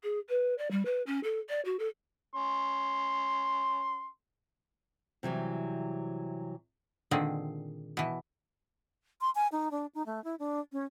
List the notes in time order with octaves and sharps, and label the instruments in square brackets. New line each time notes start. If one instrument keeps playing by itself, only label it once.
[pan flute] G#4
B4
D5
G3
B4
C#4
A4
D5
F#4
A4
[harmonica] C#4 C6
[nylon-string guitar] C3 E3 F#3 G3
[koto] A#2 D3 D#3 G#3 C4
B2 E3
[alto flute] C6
G#5
D#4
D4
D#4
A3
E4
D4
C#4